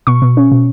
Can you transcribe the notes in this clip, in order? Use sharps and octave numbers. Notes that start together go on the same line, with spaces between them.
B2 C#6
B2
C#4
B2